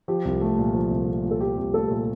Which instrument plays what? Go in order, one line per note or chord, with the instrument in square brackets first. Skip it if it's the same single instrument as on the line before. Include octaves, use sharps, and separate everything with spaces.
[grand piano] F3 [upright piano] G4
[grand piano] C2
A3
A#2
F3
C2
A3
A#2
[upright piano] A4
[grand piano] F3 [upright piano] G4
[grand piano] C2
[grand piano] A3 [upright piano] A4
[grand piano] A#2